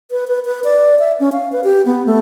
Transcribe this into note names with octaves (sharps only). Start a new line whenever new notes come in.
B4
B4
B4
D5
E5
C#4
F5
B4
G4
B3
A3